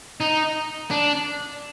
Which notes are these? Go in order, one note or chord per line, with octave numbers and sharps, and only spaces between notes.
D#4
D4